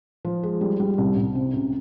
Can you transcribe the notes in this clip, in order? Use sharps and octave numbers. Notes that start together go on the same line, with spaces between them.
F3
G#3
G3
G3
C2
C2
C3
C#2